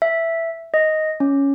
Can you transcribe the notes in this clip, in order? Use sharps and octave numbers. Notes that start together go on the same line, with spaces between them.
E5
D#5
C#4